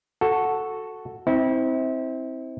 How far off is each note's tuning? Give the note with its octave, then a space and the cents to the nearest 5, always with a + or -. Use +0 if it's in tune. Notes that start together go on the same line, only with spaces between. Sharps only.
F#4 +0 A4 +0
C4 +0 E4 -35